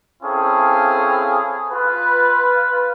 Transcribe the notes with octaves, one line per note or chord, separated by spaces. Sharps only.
C4 C#4 E4 G#4 A4 F5
F4 B4